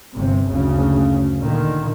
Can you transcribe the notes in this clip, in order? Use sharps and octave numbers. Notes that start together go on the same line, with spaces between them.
G1 C3
F#1 D2 C#3
A#2 D3 D#3